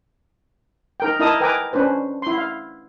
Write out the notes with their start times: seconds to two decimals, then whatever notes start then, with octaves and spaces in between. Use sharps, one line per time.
1.00 D#4 A#4 G5
1.19 D#4 E4 A#4 D#5 A5 D#6
1.40 A#4 B4 G5 G#5 A#5 D6
1.73 C#4 D4 B4 C5
2.22 E4 C6
2.38 F5